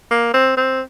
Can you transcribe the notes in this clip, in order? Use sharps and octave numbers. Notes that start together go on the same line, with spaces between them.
A#3
C4
C4